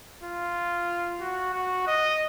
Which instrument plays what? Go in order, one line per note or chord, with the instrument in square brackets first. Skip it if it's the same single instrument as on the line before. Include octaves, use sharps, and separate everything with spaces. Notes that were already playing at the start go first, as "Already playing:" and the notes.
[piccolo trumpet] F4
F#4
F#4
D#5